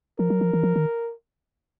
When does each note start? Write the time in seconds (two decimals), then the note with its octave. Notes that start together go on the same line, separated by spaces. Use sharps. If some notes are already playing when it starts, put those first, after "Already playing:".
0.19 F3 A#4
0.30 F#3
0.41 F3
0.53 E3
0.63 F3
0.76 D#3